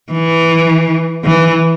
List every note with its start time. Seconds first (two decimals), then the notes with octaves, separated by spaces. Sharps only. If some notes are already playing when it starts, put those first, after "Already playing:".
0.12 E3
1.24 E3